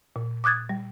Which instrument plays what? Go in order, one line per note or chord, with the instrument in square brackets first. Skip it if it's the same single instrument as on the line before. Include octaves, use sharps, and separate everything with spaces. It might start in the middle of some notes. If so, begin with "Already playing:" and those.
[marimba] A#2
D6 D#6 F#6 G#6 A6
G3